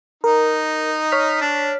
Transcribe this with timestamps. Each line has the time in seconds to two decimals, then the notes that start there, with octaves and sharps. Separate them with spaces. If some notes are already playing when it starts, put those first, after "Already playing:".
0.24 D#4 A#4
1.12 C#5 F6 B6
1.41 D4